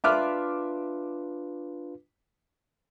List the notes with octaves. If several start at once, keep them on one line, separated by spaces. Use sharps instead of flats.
D4 F4 B4 E5 D6 F6